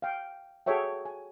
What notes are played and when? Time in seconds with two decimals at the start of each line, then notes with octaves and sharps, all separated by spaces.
0.02 F5 G5
0.66 F#4 G#4 A4 C#5 E5 G5
1.05 G#5